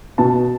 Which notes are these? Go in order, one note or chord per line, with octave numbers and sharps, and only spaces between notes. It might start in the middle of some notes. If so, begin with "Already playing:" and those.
B2 A5